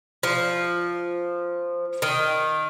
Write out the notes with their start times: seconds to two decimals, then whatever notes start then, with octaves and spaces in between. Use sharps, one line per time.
0.23 F3
2.02 D#3